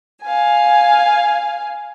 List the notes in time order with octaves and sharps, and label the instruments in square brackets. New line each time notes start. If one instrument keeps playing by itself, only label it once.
[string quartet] F5 G#5